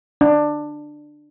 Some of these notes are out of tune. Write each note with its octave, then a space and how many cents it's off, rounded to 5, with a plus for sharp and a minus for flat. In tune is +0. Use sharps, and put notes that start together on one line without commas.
D4 +15